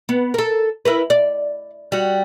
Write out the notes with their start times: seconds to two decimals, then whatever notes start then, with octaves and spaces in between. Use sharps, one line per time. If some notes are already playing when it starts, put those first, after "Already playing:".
0.09 B3
0.34 A4 A#4
0.85 E4 A#4 B4
1.10 D5
1.92 G3 F#4